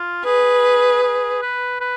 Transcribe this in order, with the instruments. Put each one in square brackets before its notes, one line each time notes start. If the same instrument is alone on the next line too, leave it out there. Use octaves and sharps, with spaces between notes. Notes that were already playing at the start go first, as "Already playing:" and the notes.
Already playing: [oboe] F4
[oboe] G#4 [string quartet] B4
[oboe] G#4
B4
B4